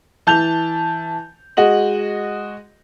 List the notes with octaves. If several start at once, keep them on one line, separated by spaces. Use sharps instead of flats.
E3 A5 G6 F7
G#3 F#4 D#5 F#7